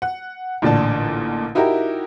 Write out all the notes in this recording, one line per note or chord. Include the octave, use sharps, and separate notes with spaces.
F#5
A1 A#2 D3 D5 A5
D#4 E4 F#4 G4 A#4